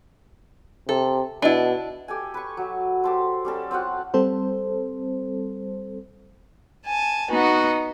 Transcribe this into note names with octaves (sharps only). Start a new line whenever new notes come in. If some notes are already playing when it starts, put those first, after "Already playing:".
C3 A4
B2 D4 E4 D#5 A5
G4 A4 G#5
B4 C#6
F#3
G4 A4 C5
G3 C#4 A4
C4 F4 F#4 F#5
G3 C4 A4 C5
G#5 A5
B3 D#4 F#4